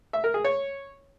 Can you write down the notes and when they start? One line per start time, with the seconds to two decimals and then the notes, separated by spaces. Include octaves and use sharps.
0.13 E5
0.24 A#4
0.34 G#4
0.44 C#5